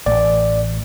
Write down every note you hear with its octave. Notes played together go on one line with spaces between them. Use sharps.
A1 D5